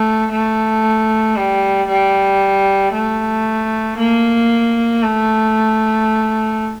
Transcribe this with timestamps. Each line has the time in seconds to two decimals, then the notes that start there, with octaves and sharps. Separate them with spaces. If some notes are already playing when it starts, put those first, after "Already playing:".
Already playing: A3
0.31 A3
1.36 G3
1.88 G3
2.93 A3
3.98 A#3
5.03 A3